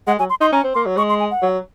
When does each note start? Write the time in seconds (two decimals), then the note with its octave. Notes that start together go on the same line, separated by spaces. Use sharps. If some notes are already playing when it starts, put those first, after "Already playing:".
0.07 G#3 F#5
0.19 F#3 G#5
0.30 C6
0.41 D#4 C6
0.52 C#4 A#5
0.64 C4
0.74 A#3 C6
0.86 F#3
0.97 G#3 C#6
1.09 C6
1.20 G#5
1.31 F#5
1.42 F#3